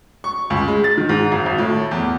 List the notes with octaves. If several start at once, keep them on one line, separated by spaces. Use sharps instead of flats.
C#6
C#2
G#3
A6
D#3
G#2
G#1
G#1
A2
E2